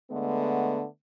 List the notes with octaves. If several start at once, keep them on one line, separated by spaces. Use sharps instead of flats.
D3 G#3 A3 B3